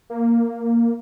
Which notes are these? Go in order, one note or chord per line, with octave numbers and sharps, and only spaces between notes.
A#3